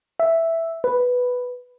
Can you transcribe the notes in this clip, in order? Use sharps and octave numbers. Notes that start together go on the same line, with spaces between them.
E5
B4